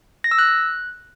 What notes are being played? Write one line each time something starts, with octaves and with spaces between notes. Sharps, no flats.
A#6
E6
F#6